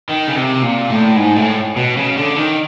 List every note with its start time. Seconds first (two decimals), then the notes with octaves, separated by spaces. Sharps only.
0.09 D#3
0.28 C#3
0.36 C3
0.62 A#2
0.90 A2
1.16 G#2
1.36 A2
1.76 B2
1.97 C#3
2.17 D3
2.36 D#3